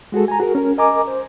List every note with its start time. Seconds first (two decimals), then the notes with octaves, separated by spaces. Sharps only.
0.12 G#3 F#4 G#4 A4
0.28 G#5 A#5
0.40 F#4 G#4 A#4
0.55 C#4 A#4
0.78 A#4 D#5 G#5 A#5 D6
1.07 C5